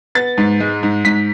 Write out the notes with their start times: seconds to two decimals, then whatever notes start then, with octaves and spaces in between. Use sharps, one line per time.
0.15 B3 A6
0.38 G#2
0.60 G#3
0.83 G#2
1.05 G#2 B6